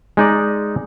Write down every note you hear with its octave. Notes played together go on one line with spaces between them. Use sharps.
G#3 D#4 D5